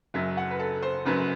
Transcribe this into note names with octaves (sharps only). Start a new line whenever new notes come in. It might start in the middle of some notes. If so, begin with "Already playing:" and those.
F#1 F#2 F#3 E5
F#5
B4
A4
C5
F#1 F#2 F#3 B4